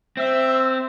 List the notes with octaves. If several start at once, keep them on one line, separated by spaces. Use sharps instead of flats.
C4 E5